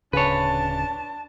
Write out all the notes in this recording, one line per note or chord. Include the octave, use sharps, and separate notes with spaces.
D1 C#3 D4 B4 C#5 A5